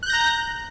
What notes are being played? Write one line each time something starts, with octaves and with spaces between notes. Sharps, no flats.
A#5 F#6 G6 A#6